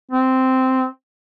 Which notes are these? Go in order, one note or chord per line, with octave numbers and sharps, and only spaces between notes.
C4